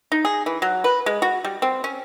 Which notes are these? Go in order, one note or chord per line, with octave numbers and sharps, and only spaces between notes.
D#4
G#4
E3
F#3
B4
G#3
F#4
G3
C4
C#4